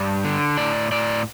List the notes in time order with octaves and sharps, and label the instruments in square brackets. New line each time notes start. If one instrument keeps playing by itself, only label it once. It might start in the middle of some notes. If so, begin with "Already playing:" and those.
Already playing: [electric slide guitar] G2 D5
D3
A2 D5
A2 D5